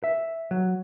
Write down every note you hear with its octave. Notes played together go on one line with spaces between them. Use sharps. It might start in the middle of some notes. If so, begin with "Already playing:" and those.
E5
F#3